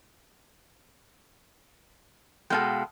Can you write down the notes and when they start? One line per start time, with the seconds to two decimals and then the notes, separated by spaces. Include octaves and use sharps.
2.50 B2 G#3 A4 F5 G5